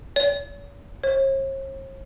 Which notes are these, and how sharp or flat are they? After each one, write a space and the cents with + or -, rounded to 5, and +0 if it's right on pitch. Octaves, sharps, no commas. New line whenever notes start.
C#5 +40
C#5 -45